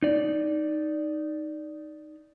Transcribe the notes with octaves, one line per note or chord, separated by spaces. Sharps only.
D#4 D5